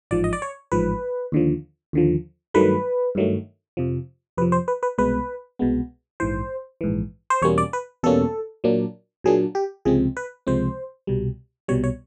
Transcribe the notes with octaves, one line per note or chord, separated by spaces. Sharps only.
A1 G#2 F3 D5
D#5
D5
C#5
A1 G#2 F3 B4
D#2 D3 F3
D#2 D3 F3
G2 D#3 F#3 A3 B4
G2 D#3 F#3 A3
F2 C3 F3
F2 C3 F3 B4
C5
B4
B4
C2 B2 G#3 B3 B4
C2 B2 G#3 B3
A#1 G#2 E3 C5
A#1 G#2 E3
C5
E2 B2 G3 A#3 C#4 C#5
D5
B4
E2 B2 G3 A#3 C#4 A4
A#2 F#3 A#3 D4
A#2 F#3 A#3 D4 G#4
G4
C#2 C3 F3 G#3 C4 G#4
B4
C#2 C3 F3 G#3 C4 C5
C2 B2 G3
C2 B2 G3 C#5
C#5